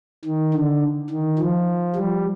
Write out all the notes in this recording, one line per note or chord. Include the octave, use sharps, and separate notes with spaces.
D#3
D3
D#3
F3
G3